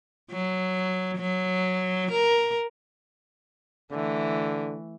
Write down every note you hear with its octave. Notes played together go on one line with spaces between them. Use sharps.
F#3
F#3
A#4
D3 E3 A3